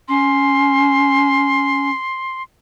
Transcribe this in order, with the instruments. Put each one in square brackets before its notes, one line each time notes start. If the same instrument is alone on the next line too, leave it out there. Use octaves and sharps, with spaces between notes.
[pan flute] C#4 [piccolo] C6